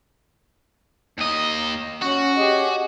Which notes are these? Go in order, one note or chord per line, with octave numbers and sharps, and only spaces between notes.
D#2 D#5
C#4 F#4
G4 G#4 D#5